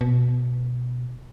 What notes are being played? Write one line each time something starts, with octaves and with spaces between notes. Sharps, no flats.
B2